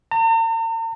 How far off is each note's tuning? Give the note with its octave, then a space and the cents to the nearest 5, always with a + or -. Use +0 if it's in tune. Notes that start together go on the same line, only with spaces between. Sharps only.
A#5 -45